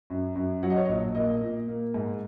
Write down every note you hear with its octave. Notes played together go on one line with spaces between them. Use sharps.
F#2
F#2
F#3 F#5
D#5
C#5
A#1 D#5
A#3 D#5
A#2
A#3
G#2